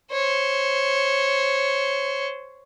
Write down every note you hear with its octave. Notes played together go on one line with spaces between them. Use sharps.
C5 C#5